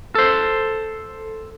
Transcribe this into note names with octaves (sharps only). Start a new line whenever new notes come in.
A4 C5